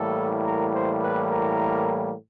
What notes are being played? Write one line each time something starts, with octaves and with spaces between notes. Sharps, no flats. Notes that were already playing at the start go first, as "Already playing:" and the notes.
Already playing: A2 E3 G3 A#3 A4
A#4
C5
B4
A#4